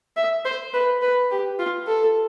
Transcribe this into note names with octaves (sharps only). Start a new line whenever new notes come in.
E5
C5
B4
B4
G4
F4
A4